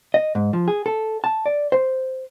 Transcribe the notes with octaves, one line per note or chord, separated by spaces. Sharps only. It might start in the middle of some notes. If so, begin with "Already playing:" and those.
D#5
G#2
F3
G#4
A4
A5
D5
C5